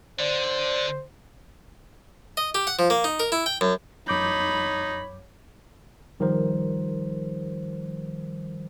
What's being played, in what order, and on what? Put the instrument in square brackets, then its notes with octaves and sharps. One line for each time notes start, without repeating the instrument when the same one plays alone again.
[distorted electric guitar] D3 [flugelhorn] C5 [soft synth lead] D5
[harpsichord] D#5
G4
F#5
F3
A#3
D#4
A#4
E4
G5
F#2
[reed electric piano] F#2 D6 G6 [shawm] D#4 [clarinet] C#5 [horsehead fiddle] B5
[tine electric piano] G#1 D#3 F3 G3 A#4 C5